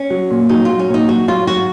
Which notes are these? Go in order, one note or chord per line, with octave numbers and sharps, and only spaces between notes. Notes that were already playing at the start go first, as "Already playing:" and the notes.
Already playing: C#4
F#3
A#2
F#3 D#4
F#3 F4
C#4
A#2 D#4
F#3 F#4
F#3 F4
F#3 F#4